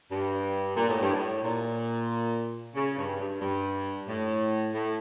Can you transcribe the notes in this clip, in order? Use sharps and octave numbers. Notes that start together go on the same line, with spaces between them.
G2
A#2
A2
G2
A2
A#2
C#3
G2
G2
G2
A2
A2